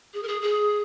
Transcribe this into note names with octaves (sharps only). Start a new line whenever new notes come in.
G#4
A#4
G#4
G#4